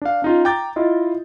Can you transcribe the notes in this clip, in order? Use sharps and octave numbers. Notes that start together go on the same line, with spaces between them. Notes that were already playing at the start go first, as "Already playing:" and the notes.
D4 F5
C#4 D#4 F4
G5 A#5 D6 G6 A6
E4 F4 D#5